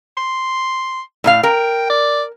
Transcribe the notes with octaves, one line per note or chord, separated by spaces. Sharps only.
C6
A2 D#4 F5
A#4 G5
D5